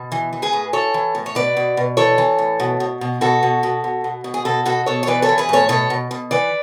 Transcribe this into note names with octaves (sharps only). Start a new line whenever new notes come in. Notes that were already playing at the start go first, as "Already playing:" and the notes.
Already playing: B2
E3
E3
G#4 B4
A2
E3 A4 C#5
E3
A2
C#5
B2 B4 D5
B2
B2
E3 A4 C#5
E3
A2
B2
B2
B2
B2 F#4 A4
B2
B2
B2
B2
B2
G#4
B2 F#4 A4
B2 F#4 A4
B2 A4 C#5
C#5
E3 B4 D5
A4 C#5
E3
G#4 B4
A2 A4 C#5
B2 A4 C#5
B2
B2
E3 B4 D5